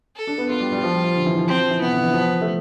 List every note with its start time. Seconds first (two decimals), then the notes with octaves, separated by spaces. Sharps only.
0.16 A4
0.27 D4
0.38 B3
0.50 B3 F4
0.60 G3
0.72 G3
0.83 F3
0.93 G3
1.04 F3
1.16 D3
1.26 E3
1.37 F3
1.48 F3 C4
1.59 F3
1.70 E3
1.81 C3 B3
1.92 D3
2.03 E3
2.13 F3
2.41 A3